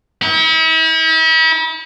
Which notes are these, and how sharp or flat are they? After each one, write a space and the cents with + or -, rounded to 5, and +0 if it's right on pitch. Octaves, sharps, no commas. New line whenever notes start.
E4 -40